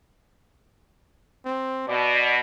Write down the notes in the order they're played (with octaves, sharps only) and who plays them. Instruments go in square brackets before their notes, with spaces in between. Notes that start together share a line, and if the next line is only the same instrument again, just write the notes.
[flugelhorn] C4
[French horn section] B2 [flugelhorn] D5